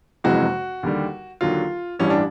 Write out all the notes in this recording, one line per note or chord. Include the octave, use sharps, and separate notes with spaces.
F#1 F2 C3 E3 G#3 F#4
D#2 D3 G3
D#2 D3 F#3 F4
A1 G2 E3 G3 C#4
D4